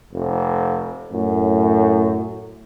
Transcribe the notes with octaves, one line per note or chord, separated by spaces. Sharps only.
F1
F#2 A2